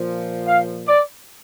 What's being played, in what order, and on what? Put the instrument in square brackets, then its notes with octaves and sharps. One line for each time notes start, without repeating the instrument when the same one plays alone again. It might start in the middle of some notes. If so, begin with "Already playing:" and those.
Already playing: [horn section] A#2 F3
F5
D5